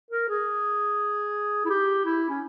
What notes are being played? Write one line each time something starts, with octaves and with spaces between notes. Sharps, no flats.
A#4
G#4
E4
G4
E4
C#4